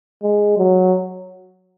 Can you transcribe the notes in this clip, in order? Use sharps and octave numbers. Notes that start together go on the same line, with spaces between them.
G#3
F#3